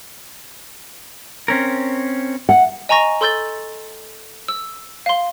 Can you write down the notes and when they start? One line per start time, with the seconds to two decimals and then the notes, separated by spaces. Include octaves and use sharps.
1.48 C4 C#4 A#4
2.49 F#5
2.89 D#5 G#5 A#5 C#6 A#6
3.21 A4 C6 E6 G6 A6 G7
4.48 E6
5.06 F5 C6